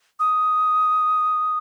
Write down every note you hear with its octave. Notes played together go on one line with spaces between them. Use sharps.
D#6